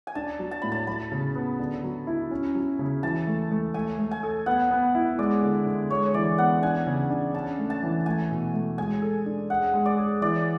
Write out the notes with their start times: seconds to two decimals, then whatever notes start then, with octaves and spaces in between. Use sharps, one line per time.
0.07 G#5
0.15 D4 A5
0.39 F#3
0.51 A5
0.62 A2 B5
0.72 A5
0.87 F#3 B5
1.12 C#3
1.35 B3
1.59 D3
1.83 F#3
2.07 E4
2.31 C#4
2.55 F#3
2.79 C#3
3.03 E3 A5
3.27 A3
3.51 A3
3.74 A3 G#5
3.99 A3
4.11 G#5
4.23 A4
4.46 B3 F#5
4.71 B3
4.95 E4
5.19 G#3 D5
5.43 D3
5.67 D3
5.90 G#3 C#5
6.14 E3 D5
6.38 B3 F#5
6.62 D4 G#5
6.86 C#3
7.10 D4
7.34 C#4 A5
7.58 A3
7.70 A5
7.83 E3
8.06 A3 G#5
8.30 B2
8.54 A3
8.78 G#3 G#5
9.02 A4
9.26 D4
9.50 G#4 F#5
9.74 G#3
9.86 D5
9.98 G#4
10.22 E3 D5